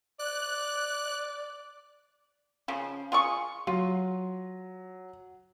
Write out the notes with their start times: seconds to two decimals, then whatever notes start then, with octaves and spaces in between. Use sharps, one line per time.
0.19 D5 F#6
2.68 C#3 F3
3.12 F4 G#4 C#6
3.67 F#3 F4